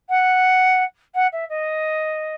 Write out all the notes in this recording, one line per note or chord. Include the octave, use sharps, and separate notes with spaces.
F#5
F#5
E5
D#5